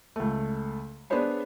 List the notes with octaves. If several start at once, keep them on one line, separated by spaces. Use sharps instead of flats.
C#2 A3
B3 D4 G#4 C5 C#5 B5